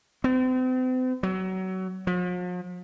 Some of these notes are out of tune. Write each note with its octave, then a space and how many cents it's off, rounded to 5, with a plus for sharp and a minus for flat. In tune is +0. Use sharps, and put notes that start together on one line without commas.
C4 -40
F#3 +25
F3 +45